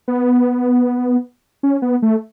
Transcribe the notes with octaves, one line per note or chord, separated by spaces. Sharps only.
B3
C#4
B3
A3